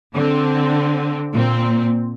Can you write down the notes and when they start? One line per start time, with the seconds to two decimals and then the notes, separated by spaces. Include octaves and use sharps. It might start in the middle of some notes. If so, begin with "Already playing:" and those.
0.13 D3 C4
1.32 A#2 C4